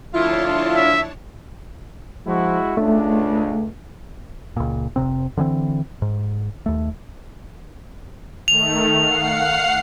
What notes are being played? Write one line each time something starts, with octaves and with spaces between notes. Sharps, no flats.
D2 F3 D4 E4 F4 C#5 A5
E5
F3 G#3 E4 F#4
C#2 A3 D4
C#2 A#2
F1 C2 C3 C4
D3 E3 B3 C4
G#2
D#2 A3
D#3 A3 F7
F5 F#5 C7